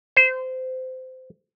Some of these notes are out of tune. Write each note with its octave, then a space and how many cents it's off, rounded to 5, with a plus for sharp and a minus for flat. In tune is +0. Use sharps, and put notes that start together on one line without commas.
C5 -20